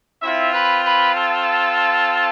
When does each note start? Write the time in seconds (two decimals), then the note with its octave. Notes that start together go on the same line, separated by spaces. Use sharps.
0.22 C4 E4 F4 E5
0.52 B4 B5
0.84 B4 B5
1.15 A4 A5